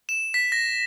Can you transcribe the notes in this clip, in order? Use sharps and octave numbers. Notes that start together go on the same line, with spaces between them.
E7
B6
A#6